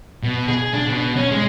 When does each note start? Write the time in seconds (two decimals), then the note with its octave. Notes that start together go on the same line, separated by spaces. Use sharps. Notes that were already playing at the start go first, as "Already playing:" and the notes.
0.23 B2
0.48 G#4
0.74 D4
0.88 B2
1.16 C#4
1.32 G#3